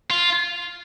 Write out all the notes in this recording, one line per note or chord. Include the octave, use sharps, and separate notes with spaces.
F4